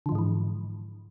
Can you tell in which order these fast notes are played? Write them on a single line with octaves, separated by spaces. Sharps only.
D3 F3 G#2 G#3 E3